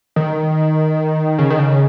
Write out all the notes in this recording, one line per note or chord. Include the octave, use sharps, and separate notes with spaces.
D#3
C#3
D#3
C#3